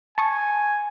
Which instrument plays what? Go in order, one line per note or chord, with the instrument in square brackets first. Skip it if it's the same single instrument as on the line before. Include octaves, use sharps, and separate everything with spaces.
[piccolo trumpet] G#5 [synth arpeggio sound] A5 C#6 D#6